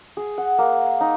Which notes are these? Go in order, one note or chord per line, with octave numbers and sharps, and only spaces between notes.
G#4
F#5
A#3
D#4